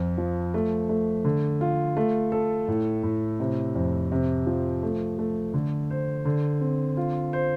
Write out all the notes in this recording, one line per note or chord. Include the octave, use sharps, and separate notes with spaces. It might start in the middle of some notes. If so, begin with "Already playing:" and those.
Already playing: F2
F3
A3
A3
D3
F4
A3
A4
A2
A2
C3
F2
C3
F3
A3
A3
D3
C5
D3
C4
F4
C5